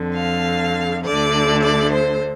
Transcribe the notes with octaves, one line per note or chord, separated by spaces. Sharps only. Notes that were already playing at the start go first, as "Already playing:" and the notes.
Already playing: F2 D3
F5
D2 D3 D5
D5
C5